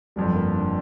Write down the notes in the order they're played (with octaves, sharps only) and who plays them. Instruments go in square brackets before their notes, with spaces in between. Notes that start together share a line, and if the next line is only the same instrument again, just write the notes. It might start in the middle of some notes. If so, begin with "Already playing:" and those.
[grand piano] G1 F2 F3 [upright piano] G3
[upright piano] A#3
D4